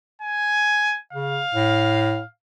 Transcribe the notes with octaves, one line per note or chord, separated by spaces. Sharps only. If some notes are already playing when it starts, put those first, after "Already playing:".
G#5
C#3 F5
A2